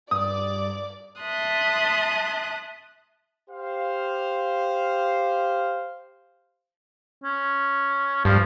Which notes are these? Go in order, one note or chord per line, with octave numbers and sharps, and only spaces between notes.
G2 D5 D6 D#6
E5 A5 C6 D#6 F#6
G4 C5 F5
C#4
G2 F3